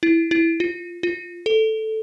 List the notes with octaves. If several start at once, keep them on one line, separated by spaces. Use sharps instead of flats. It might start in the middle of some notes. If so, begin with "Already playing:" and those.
E4
E4
F4
F4
A4